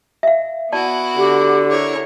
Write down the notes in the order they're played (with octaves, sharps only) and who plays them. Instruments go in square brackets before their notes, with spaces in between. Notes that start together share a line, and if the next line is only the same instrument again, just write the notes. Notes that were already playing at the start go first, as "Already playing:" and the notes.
[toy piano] E5 F5
[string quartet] B3 E4 F#4 [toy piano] D5 A5
[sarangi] D3 [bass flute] G4
[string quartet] E4 A#4 C#5